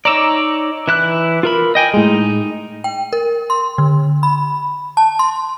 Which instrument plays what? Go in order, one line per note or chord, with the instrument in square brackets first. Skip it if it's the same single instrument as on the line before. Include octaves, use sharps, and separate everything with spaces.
[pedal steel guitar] D#4 C#5 D5 [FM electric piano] A#5 D6 E6
[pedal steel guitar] E3 E4 F#6
F4 A#4 B5
D#5 G5 G#5
[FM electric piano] A2 G#3 [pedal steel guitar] D#4
[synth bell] G5
A#4
C6
D3
B5
A5
C6